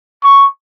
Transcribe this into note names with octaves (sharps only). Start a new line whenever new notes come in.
C#6